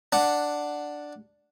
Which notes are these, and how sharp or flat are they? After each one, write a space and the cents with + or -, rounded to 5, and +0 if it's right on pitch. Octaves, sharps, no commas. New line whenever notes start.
D4 +0 F#5 +0